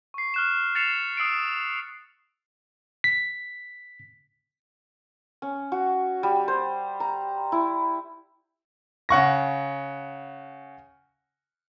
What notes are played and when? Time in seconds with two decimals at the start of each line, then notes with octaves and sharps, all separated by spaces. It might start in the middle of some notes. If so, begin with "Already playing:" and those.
0.14 C#6 C7
0.34 F6 F#6 E7
0.75 A6 C7 C#7 E7 F7
1.17 D#6 E6 C7 D7
3.04 B6
5.42 C#4
5.72 F#4
6.23 G3
6.48 C5
7.00 A#5
7.52 E4
9.09 C#3 F#5 C#6 A#6